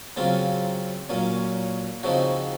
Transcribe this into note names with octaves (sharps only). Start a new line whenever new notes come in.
C#3 F#3 C4 F4
A#2 F#3 C#4
C#3 F3 C4 D#4 F#4